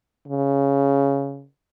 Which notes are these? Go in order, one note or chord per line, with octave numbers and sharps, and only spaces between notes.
C#3